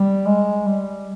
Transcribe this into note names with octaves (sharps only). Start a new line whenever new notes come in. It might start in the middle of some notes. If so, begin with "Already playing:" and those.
Already playing: G3
G#3
G3